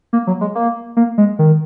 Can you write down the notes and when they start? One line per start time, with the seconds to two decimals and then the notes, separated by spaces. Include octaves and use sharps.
0.13 A#3
0.27 F#3
0.41 G#3
0.55 A#3
0.97 A#3
1.18 G#3
1.39 D#3